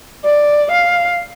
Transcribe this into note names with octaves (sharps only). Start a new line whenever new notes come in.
D5
F5